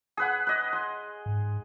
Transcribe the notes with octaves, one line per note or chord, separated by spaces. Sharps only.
G#4 B4 F#5
B4 D#5
C6
G#2